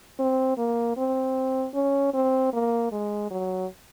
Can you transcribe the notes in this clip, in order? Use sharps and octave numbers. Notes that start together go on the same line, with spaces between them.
C4
A#3
C4
C#4
C4
A#3
G#3
F#3